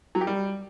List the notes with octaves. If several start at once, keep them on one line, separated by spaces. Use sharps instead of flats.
F#3
G4
G3